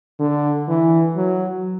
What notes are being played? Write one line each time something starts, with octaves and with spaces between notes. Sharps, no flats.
D3
E3
F#3